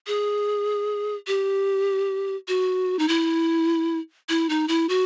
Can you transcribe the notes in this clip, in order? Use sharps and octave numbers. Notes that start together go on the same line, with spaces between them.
G#4
G4
F#4
D#4
E4
E4
D#4
E4
F#4